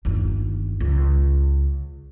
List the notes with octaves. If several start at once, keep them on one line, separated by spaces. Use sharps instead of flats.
G1 D#2
C#2